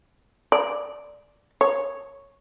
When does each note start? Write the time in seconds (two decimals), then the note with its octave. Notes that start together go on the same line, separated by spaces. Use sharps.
0.52 D5
1.61 C#5